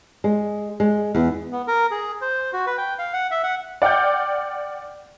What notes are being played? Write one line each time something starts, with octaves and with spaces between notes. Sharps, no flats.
G#3
G#3
E2
B3
A#4
G#4
C5
F#4
B4
G5
F5
F#5
E5
F#5
D5 F#5 G5 F6 G6